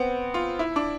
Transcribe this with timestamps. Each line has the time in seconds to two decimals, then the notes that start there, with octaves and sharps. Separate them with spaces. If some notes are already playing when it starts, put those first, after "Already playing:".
Already playing: B3 C4
0.34 F4
0.59 E4
0.76 D4